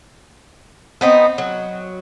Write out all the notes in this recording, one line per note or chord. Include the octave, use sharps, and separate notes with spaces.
B3 C4 D#4
F#3